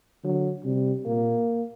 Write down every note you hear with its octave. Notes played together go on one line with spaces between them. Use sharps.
D3 F#3
C3 G3
A#2 A#3